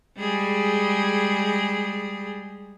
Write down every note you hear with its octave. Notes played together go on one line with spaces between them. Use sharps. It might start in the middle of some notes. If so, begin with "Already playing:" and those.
G3 G#3 G#4